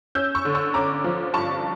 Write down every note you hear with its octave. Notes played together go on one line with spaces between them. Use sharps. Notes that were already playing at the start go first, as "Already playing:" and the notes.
C#4 E6 G6
C#6 E6
D3
C#6 E6
C#4 A#5 D6
F3
G2 A5 C#6